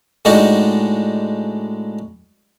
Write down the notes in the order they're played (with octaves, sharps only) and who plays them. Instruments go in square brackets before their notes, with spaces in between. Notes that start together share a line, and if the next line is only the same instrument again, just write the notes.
[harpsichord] A2 G#3 D4 D#4 F#4